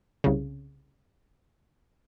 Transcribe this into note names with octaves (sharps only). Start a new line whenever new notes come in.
C2 C#3